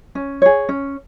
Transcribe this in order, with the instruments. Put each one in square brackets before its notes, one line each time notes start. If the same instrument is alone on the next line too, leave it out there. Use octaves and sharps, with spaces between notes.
[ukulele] C#4
G#4 C#5
C#4